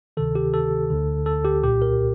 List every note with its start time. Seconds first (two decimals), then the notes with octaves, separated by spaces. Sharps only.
0.17 D2 C3 D#3 A4
0.35 G4
0.54 A4
0.90 D2 D3
1.26 A4
1.45 G4
1.63 C2 A#2 G4
1.82 A#4